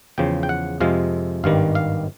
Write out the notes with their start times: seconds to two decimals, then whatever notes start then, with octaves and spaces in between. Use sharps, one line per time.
0.18 E2 C#3 F3 G5
0.43 G5
0.49 F#5
0.80 F2 C3 F3 G#3 F5
1.44 G#1 G2 D#3 G3 F5
1.75 F5